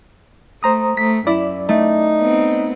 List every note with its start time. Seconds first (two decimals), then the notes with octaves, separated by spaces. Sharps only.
0.63 A3 C5 A#5 D#6
0.97 A3 B6
1.27 F#2 E4 D5
1.69 A3 D#4
2.21 B3 C4